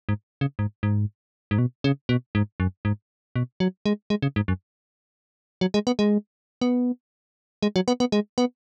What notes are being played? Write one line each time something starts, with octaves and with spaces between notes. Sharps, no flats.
G#2
C#3
G#2
G#2
G#2
B2
C#3
B2
G#2
F#2
G#2
B2
F#3
G#3
G#3
C#3
G#2
F#2
F#3
G#3
B3
G#3
B3
G#3
F#3
B3
B3
G#3
B3